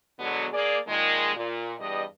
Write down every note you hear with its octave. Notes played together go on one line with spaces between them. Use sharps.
B2 D3 F#3 G#3 B3
A#3 G#4 D5
A#2 D#3 G#3
A#2
E2 G2 G3 D#5